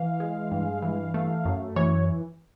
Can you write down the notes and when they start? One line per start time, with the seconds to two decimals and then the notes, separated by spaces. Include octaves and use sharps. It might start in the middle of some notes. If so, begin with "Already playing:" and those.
Already playing: E3 F5
0.20 G#3
0.51 G2
0.82 E3
1.14 A3
1.45 F#2
1.76 E3 C#5